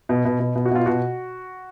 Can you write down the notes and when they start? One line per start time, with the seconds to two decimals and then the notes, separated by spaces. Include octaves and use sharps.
0.09 B2
0.25 B2
0.40 B2
0.55 B2
0.65 F#4
0.71 B2 F4
0.86 B2 F#4